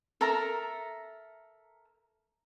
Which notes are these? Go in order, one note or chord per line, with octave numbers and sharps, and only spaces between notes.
A4 A#4 E5 A#5